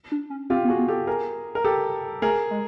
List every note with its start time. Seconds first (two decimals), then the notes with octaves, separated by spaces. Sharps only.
0.12 D4
0.30 C#4
0.50 C4 F4 G4
0.65 B3
0.68 F#4 G#4
0.78 B3
0.88 G4 A4
1.07 G#4 A#4
1.55 A#4
1.64 G4 A4
2.22 A3 G#4 A#4
2.51 G#3